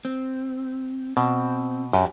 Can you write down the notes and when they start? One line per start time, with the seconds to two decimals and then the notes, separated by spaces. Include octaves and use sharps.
0.05 C4
1.17 B2 C4
1.93 F#2 D4 F#4 G4